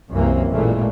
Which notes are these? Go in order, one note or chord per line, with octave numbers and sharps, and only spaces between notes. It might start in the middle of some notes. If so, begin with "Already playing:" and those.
C2 F#2 C3 E3 A#3 C4
A1 A#2 E3 G#3 A3